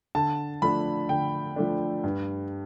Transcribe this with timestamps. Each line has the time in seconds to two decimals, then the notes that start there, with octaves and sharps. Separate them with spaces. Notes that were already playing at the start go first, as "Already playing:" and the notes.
0.15 D3 A5
0.62 F3 A3 D4 B5
1.09 D3 G5
1.56 F3 A3 D4
2.04 G2